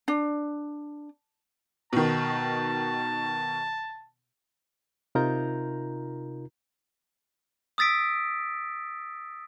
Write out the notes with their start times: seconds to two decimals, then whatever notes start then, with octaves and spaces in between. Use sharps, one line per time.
0.08 D4
1.93 B2 D#3 A5
5.15 C3 D#4 F4 A#4 A#5 G6
7.78 D#6 E6 A6 B6 D7